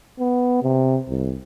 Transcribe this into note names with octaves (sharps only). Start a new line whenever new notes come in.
B3
C3
C2